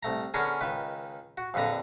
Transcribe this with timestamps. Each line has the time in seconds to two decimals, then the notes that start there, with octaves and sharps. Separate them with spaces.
0.03 C2 A3 A#5
0.34 D3 B3 C#4 G#4 A#4 G#5
0.61 C#2 D#3 B4
1.37 F#4
1.54 A#1 F2 D3 B4 A#5